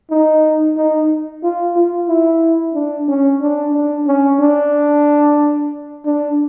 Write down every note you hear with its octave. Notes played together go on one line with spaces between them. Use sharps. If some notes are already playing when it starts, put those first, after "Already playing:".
D#4
D#4
F4
F4
E4
D4
C#4
D4
D4
C#4
D4
D4